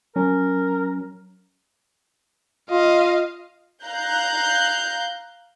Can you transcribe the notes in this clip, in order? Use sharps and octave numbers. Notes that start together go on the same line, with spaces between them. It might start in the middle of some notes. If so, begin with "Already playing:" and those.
F#3 C#4 A#4
F4 D#5 F5
F5 A#5 F#6 G6